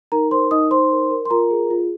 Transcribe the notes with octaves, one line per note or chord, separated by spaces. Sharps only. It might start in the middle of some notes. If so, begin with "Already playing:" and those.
D#4 A#4 A#5
A#4 C5 C6
D#4 D#5 D#6
D#4 C5 C6
A#4
A#4
C6
F4 A#4 A#5
G#4
F4